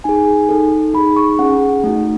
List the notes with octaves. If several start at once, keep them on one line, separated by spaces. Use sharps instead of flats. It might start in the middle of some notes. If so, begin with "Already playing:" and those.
D#4 G#4 G#5
D#4 A4
D#4 G#4 B5
C#6
C#4 G#4 F#5
A3 D#4 F#4